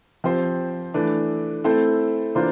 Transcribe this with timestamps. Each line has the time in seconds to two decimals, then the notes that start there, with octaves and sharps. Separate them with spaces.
0.24 F3 C4 G4 C5
0.94 E3 A3 D4
1.64 A3 C4 E4 A4 C5
2.35 E3 A#3 D4 F4 C5